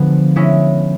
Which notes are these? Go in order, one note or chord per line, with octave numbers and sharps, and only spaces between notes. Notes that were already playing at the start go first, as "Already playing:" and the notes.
Already playing: D3 F3 G#3 B3
G#3 C#4 E4